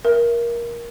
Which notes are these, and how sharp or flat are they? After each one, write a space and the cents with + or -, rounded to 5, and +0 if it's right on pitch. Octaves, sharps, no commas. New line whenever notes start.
A#4 +15 E5 +20